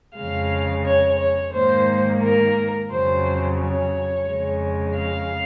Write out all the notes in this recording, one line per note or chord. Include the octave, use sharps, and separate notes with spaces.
F2 C#3 G#3 F5
C#5
C#5
G#2 D#3 A#3 C5
A#4
F2 C#3 F#3 C5
C#5
F2 C#3 G#3
F5